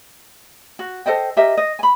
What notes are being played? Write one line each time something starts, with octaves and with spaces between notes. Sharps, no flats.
F#4
A4 C5 D#5 G5
G4 A#4 D#5 E5
D#5
G#5 B5